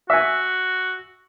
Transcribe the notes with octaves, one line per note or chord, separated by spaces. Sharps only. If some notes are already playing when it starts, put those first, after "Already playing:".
F#4 E5 G#5